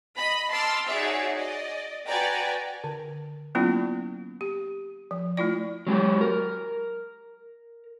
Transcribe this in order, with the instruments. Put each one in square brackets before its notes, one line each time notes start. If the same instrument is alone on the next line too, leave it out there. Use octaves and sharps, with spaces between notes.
[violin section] D#5 B5
A5 C6 D6 E6 F6
D#4 F#4 G#4 C#5 D5 E5
D5 D#5
F#4 B4 D5 G5 G#5 A#5
[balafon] D3
F#3 A#3 B3 C#4 E4 F4
G4
F3
A3 E4 F4 D5
[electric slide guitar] F#3 G#3 F#4 G4
A#4